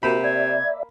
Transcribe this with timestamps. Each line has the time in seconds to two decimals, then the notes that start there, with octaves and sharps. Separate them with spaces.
0.03 C3 A#3 F#4 B5
0.24 D5 E5 G#6